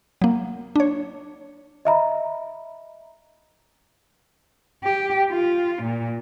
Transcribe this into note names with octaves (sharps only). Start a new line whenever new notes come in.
F#3 A#3
D4 C#5
D#5 E5 A#5 B5
G4
F4
A#2